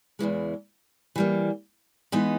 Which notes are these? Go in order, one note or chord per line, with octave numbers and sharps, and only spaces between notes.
E2 C#3 E3 G#3
E3 G3 A#3
E3 G#3 B3 D#4